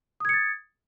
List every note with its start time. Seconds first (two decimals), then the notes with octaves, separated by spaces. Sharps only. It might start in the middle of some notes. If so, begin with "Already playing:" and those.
0.20 D#6
0.25 G#6
0.29 C#7
0.33 A6